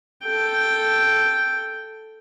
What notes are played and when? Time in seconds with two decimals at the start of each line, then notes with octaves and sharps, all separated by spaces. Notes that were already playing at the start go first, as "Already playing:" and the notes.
0.25 A4 G5